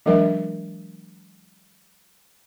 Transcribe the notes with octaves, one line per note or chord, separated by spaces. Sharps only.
E3 F#3 G#3 D4 A#4 E5